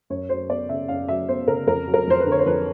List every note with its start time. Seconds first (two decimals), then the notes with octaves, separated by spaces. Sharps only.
0.10 F#2 C#5
0.29 F#3 C5
0.50 B3 D5
0.69 C#3 E5
0.88 F#2 F5
1.08 F#3 E5
1.28 B3 C5
1.48 C#3 A#4
1.67 F2 A#4
1.88 F#3
1.94 A#4
2.07 F2 C5
2.20 B4
2.26 D3
2.32 C#5
2.39 C5
2.46 F2 B4